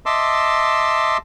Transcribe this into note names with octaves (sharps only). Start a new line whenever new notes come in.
D#5 E5 A5 C6 D6 E6